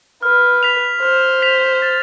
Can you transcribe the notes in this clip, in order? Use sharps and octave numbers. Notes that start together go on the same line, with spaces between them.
B4 F6
B6 F7
C5 F6
B6 F7
A6